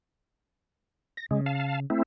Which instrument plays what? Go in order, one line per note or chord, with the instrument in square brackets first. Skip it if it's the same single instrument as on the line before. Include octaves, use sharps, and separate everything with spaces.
[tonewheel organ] A#6
[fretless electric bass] C#3 [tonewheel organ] G#3
[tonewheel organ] F5 A5
A3 C4 E4